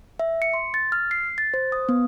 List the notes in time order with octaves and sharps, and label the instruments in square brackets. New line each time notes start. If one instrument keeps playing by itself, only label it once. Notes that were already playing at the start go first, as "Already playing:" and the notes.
[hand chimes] E5
C#7
C6
A6
F6
C7
A6
C5
D#6
B3